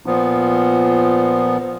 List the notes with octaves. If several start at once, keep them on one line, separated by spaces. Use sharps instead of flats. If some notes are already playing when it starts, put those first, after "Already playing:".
A#2 F3 B3